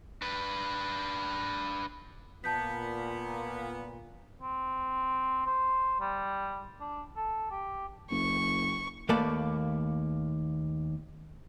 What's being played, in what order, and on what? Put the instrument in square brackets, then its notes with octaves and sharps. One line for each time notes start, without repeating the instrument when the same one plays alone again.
[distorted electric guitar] D4 B4
[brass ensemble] A#2 [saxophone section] B3 [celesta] A5 G6 B6
[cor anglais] C4
C5
G3
D4
A4
G4
[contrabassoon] F#1 [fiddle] C#6
[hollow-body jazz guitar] D#2 A3 A#3 B4 D5 A5